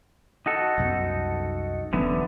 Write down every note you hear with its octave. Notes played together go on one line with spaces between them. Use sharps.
D#4 F#4 A4
C2 F#2 B2
E1 D3 E3 F#3 B3 C#4